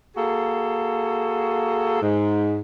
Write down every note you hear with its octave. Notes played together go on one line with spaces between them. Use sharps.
A#3 F#4 G#4 A4
G#2